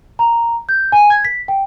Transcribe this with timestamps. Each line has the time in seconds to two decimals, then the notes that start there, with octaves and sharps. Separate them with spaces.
0.19 A#5
0.69 G6
0.92 G#5
1.10 G#6
1.25 B6
1.48 G5